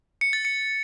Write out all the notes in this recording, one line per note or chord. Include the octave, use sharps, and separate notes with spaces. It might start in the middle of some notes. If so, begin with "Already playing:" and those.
C#7
A6
C#7